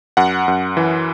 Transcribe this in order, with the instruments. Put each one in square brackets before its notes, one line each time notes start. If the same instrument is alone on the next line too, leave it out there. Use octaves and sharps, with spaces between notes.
[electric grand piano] F#2 F#5
F#2
E3